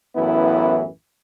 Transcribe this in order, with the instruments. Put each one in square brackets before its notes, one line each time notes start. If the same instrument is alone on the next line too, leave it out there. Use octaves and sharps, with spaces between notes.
[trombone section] A1 F#2 E3 B3 E4